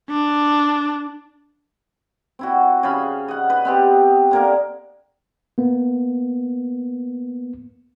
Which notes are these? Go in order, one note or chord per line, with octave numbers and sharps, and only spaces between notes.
D4
C4 E4 F#4
C#3 G#4 F5 B5
D#5 F#5
B4 D#5
B3 C4 G4
D3 A#3 A#4
A#3 B3